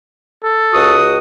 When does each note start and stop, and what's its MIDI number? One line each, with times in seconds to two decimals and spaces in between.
0.43 0.98 69
0.73 1.18 37
0.73 1.18 66
0.73 1.18 87